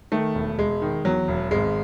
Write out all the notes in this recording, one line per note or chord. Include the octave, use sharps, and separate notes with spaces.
D#3 A3
E1
E1 G#3
D#3
E2 F#3
E1
G#1 G#3